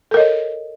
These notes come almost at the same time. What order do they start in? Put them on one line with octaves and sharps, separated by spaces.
A4 A#4 D#5 C#5